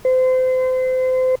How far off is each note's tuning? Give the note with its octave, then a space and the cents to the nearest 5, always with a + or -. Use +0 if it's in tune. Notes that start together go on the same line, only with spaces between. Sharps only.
C5 -30